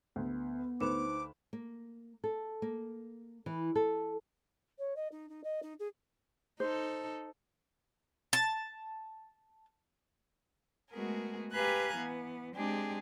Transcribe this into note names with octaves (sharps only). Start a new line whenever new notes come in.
D2 B3
D2 D#4 B4 C5 D6 E7
A#3
A4
A#3
E3
A4
C#5
D#5
D#4
D#4
D#5
D#4
G#4
D#4 A4 C5
A5
G#3 A3 B3 F#4 G#4 A#4
G4 B4 F5 G#5 A#5 F#6
E3 B3
G#3 C4 D4 G4 G#4